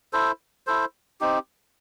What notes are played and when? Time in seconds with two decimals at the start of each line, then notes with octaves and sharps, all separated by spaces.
0.13 E4 A4 C5
0.67 E4 A4 C5
1.21 C4 D#4 G4